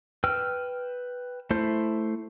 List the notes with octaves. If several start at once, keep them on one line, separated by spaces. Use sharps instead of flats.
B4 G5 E6 F6
A3 E4 C5